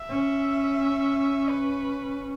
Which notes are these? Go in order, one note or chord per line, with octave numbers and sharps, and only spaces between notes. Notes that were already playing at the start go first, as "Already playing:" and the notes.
Already playing: E5
C#4
B4